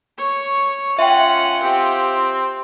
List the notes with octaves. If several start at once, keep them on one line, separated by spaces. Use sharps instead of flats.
C#5 C#6
C#4 F4 E5 F#5 G5
C4 G4